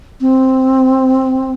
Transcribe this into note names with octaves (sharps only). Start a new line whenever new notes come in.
C4